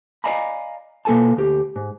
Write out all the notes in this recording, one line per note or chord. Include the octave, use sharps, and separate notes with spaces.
D5 D#5 F5 G#5 A#5 B5
B2 A#3 G4 A4 G#5 A5
D2 G4
G#2